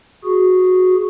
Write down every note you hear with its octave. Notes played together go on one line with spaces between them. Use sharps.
F#4 G#4